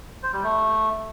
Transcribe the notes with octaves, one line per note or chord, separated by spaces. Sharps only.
C5
G3
A3